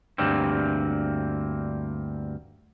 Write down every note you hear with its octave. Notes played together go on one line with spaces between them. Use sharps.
D2 G2 G3 A#3 C4